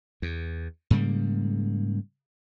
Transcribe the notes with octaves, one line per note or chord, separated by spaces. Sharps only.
E2
G#2 C#3 G3 A#3